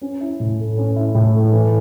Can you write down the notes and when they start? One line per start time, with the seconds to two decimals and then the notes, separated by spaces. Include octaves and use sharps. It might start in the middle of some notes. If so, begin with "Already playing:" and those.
0.02 C#4
0.21 E4
0.40 A2
0.59 A3
0.78 C#4
0.96 E4
1.15 A2
1.34 A3
1.52 E3